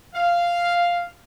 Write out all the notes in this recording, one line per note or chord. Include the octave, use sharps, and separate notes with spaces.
F5